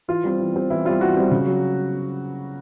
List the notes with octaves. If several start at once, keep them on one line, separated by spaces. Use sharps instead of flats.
E3 F4
G3 C4
E3
G3 C4
E3 E4
G3 C4 F4
E3 F#4
G3 C4
C#3
F#3